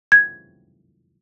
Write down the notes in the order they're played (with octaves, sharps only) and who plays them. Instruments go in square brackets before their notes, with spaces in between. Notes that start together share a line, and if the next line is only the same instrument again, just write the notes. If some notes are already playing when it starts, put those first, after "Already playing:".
[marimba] G#6